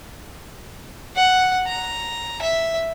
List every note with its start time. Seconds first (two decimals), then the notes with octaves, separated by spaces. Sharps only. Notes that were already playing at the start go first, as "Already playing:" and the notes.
1.16 F#5
1.67 A#5
2.42 E5